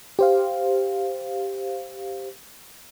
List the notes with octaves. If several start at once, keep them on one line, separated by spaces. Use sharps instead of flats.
G4 C5 F5